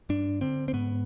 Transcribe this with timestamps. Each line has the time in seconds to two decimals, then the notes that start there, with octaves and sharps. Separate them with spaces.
0.09 G2 D4
0.41 D3 C4
0.68 C4
0.73 G#2 B3